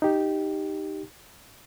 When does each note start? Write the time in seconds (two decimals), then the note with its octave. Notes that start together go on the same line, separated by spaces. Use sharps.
0.02 D#4 G4